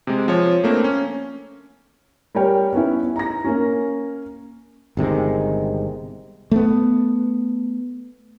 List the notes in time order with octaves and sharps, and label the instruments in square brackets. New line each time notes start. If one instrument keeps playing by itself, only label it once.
[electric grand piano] C3 G#3
F3 C#5
A3 A#3 C4 D4
C#4
[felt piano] G3 A#4 C#5 G5
B3 C#4 E4
A#5 A#6
A#3 C#4
[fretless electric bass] G1 C3 D#3 G#3
A3 B3